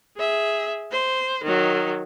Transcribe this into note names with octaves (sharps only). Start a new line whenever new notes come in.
G#4 E5
C5
D#3 F#3